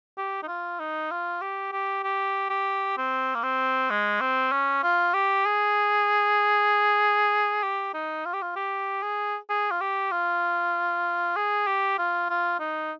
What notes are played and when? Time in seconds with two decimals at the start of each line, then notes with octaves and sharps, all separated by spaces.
0.18 G4
0.43 D#4
0.48 F4
0.79 D#4
1.11 F4
1.41 G4
1.72 G4
2.04 G4
2.50 G4
2.97 C4
3.35 A#3
3.43 C4
3.90 G#3
4.21 C4
4.52 C#4
4.83 F4
5.14 G4
5.45 G#4
7.63 G4
7.94 D#4
8.25 F4
8.34 G4
8.42 F4
8.56 G4
9.02 G#4
9.49 G#4
9.71 F4
9.81 G4
10.12 F4
11.36 G#4
11.67 G4
11.98 F4
12.30 F4
12.60 D#4